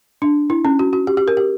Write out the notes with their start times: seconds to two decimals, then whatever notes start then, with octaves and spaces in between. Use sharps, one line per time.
0.22 D4
0.50 E4
0.65 C#4
0.79 F#4
0.93 F#4
1.07 G4
1.17 G4
1.28 A#4
1.37 G4